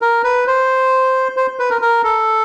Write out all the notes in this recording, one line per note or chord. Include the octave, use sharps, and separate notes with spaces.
A#4
B4
C5
C5
B4
A#4
A#4
A4